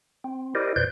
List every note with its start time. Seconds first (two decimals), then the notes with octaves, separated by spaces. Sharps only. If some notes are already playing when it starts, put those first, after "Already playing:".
0.24 C4
0.55 E4 G4 A#4 C5 D5 D#5
0.76 F2 B2 B4 C5 D5 G6